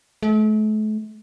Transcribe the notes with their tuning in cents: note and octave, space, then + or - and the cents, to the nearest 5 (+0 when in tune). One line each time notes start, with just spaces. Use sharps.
A3 -40